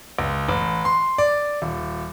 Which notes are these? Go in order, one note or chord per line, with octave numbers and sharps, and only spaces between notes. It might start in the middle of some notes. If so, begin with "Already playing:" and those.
C#2
A1
C6
D5
D#1